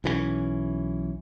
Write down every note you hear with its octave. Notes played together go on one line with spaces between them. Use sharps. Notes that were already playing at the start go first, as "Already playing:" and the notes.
B1 E3 F#3 C#4